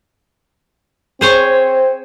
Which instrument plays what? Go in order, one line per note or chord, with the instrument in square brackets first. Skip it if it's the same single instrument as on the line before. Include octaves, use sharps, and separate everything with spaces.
[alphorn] C4 [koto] G#4 C5 C#5